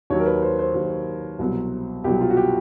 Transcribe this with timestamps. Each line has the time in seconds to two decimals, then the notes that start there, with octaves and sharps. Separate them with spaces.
0.10 D#2 D#3 F#3 C#5
0.19 A#4
0.26 B4
0.42 C5
0.59 C5
0.75 D#2 D#3 F#3
1.39 C2 B2 F#3
2.04 C2 B2 F#3 G4
2.21 F4
2.30 F#4
2.37 G4